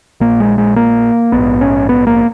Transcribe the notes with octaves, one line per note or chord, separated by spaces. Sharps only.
A#1 A#2 A#3
G#3
G#3
A#3
A#1 G#2 B3
C#4
B3
A#3